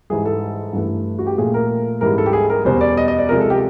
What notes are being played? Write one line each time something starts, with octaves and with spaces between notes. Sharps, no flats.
G#2 E3 G3 G#4
A4
G2 E3 A3
F#4
G4
A#2 F3 A3 G#4
A#4
G#2 E3 G3 A#4
A4
G4
G#4
A#4
E2 B2 G3 C5
D5
D#5
D#5
D5
C3 F3 G#3 A#4
A4
G4